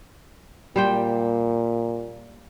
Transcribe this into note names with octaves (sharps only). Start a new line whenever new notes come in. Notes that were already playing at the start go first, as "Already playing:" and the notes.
A#2 G3 C5 G5